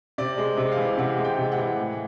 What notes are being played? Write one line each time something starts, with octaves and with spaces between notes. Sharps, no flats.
C3 D5
G#3
C3
F5
E3
C3 F#5
G#3
G5
C3
F#5
E3
A2